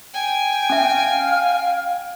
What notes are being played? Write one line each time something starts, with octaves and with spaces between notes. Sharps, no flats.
G5 G#5
C#4 E5 F5